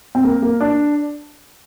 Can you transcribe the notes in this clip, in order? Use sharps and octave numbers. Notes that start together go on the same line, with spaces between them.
C4
A#3
A#3
D4